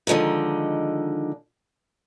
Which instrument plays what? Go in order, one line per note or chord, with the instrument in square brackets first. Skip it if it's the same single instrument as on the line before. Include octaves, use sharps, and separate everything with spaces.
[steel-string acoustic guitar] D3 D#3 F3 G#3 D#4